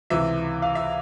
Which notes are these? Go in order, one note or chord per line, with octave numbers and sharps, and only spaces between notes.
C#2 C3 E3 E5
F5
E5